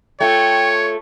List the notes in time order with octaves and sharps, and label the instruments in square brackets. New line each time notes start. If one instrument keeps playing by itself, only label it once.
[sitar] A3 F4 [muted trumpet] C#5 [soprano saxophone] G5